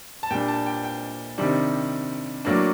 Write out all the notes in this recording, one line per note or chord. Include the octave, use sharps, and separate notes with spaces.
A5
A#2 G3 D4 G5
A5
G5
G5
C3 D#3 G3 D4
A2 F#3 A#3 D4